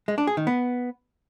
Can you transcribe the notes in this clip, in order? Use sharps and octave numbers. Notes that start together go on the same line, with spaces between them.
G#3
D4
G#4
D#3
B3